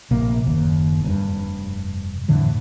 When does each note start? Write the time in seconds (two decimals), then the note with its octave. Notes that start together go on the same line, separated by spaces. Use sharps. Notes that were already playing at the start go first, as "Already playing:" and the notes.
0.11 A#1 C3 A#3
0.46 F#1 D#2
1.03 F1 G2
2.28 F2 A2 D3 E3